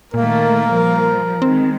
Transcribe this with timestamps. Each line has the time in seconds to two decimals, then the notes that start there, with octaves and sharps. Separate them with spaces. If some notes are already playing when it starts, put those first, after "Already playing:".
0.14 A#2 D#3 A3 A#3 A#4
0.69 F3 G3
1.42 D#3 G#3 C4